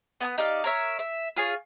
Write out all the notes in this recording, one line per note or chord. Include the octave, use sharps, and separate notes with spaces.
B3 G#5 D#6
D#4 G4 D5 F5
A#4 C#5 E5
E5
F4 G#4 C#5